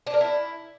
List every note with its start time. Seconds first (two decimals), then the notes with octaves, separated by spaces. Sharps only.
0.07 D4
0.14 A#4
0.21 E4